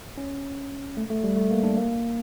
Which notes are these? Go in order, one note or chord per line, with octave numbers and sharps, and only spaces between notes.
C#4
A3
A3
G3
A3
A#3
D4
A#3